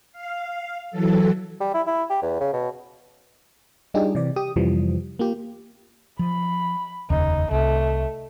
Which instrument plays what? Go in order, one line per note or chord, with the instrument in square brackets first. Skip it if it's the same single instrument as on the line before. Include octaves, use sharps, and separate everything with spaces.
[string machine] F5
E3 F#3 A4
[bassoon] G3
E4
E4
G4
E2
C#3
B2
[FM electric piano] G3 D4 D#4 F4 G4 G#4
C3 E3 D5
G4 D#6
F2 C3 E3 F3 G3
A#3 F4 G4
[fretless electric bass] F3 [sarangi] B5
[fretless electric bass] F1 D#2 C#3 [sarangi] D#4
[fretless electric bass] C2 [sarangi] A3